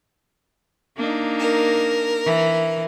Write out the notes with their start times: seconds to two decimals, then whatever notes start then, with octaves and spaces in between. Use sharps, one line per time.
0.97 A#3 D4 D#4
1.40 A#4
2.25 E3